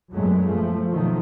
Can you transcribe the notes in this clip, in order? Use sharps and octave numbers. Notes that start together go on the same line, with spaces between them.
F#2 A#2 F#3 G#3 A3 B3
F3 A3
B2 D#3 F3 F#3 A3